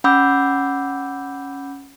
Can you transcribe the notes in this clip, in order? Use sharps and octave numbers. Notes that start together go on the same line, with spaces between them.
C#4 F#5 B5 D6 E6 G6